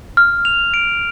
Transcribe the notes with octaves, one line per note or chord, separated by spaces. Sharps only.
F6
F7
D7